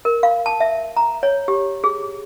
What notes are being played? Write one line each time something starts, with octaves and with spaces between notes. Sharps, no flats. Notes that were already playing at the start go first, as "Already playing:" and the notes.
A#4
F5
A5
E5
A#5
C#5
G4
G#4